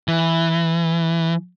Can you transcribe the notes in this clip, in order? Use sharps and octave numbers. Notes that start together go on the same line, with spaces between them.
E3